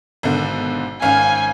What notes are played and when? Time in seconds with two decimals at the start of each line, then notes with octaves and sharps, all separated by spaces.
0.23 G#1 B2 D3
1.02 G#1 C#4 F5 G#5